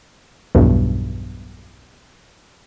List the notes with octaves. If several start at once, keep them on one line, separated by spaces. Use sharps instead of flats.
B1 E2 G2